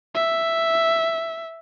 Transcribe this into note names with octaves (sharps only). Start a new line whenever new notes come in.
E5